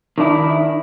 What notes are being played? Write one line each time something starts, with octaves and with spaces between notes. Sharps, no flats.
D#3 D4 E4